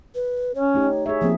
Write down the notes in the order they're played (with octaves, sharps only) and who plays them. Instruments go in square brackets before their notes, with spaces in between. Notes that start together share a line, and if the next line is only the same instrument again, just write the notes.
[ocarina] B4
[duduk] C#4 [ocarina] C#5
[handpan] A3 D#4 G4
[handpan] G#4 E5 [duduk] C#5
[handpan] F3 A#3 C4 [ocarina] G#4